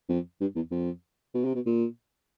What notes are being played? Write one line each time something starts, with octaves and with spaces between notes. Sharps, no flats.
F2
G2
E2
F2
B2
C3
B2
A#2